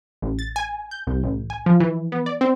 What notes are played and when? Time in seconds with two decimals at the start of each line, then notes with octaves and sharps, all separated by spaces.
0.22 A1
0.39 A6
0.56 G#5
0.91 G6
1.07 C2
1.24 A1
1.50 G#5
1.66 F3
1.80 E3
2.12 B3
2.26 D5
2.41 C4